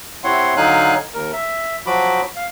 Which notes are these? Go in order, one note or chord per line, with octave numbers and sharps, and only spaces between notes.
C3 C4 E4 C#5 F#5 C6
D3 F#3 D#4 F5 G#5 F#6
D#2 A#4
E5
F3 F#3 F#4 B5 D6
F5